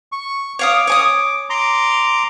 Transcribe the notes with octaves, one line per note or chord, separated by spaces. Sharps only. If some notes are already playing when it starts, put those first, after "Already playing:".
C#6
C#5 F5 D6 D#6
C#5 G#5 D#6
A#5 C6 D6